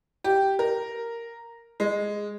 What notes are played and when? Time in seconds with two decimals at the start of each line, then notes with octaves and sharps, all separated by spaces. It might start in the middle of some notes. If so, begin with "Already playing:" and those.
0.24 G4
0.59 A#4
1.80 G#3